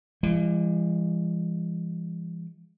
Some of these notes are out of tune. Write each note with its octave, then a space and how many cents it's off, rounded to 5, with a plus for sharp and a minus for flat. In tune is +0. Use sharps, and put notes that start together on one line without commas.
E3 +40 G#3 -40